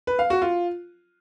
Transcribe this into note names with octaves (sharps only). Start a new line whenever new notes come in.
B4
F5
F#4
F4